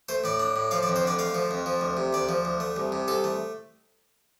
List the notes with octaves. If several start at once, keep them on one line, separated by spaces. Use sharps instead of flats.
A3 C5
A2 D5
D4
A2
F3 F5
D5
F2
C5
D3 D5
A3 F5
F3
F2
F3
D2
C3
D2 D5
F3
D2
A3
C2
C3
C2 A4
A3